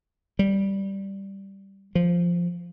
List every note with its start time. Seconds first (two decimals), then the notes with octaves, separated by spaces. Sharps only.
0.39 G3
1.95 F3